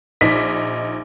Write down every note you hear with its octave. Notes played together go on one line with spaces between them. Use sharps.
A#1 D#4 B6